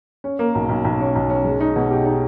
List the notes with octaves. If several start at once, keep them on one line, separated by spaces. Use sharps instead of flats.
C#4
A#3
B1
B1
B1
C#4
B1
C#4
G#3
D#4
B2
G4
D#4